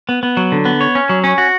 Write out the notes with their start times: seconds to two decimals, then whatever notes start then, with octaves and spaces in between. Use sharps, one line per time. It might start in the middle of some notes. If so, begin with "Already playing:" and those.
0.09 B3
0.23 B3
0.37 F#3
0.52 D3
0.65 B3
0.81 C#5
0.95 C#4
1.09 F#3
1.24 C#4
1.38 F#4